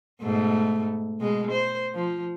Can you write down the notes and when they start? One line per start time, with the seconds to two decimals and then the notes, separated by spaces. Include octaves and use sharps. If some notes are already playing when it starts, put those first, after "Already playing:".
0.22 G#2 B2 A3
1.21 B2 G#3
1.51 C5
1.94 F3